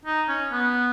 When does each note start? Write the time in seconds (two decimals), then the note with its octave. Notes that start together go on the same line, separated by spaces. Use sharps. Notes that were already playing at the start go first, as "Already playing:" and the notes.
0.05 D#4
0.28 C#4
0.52 B3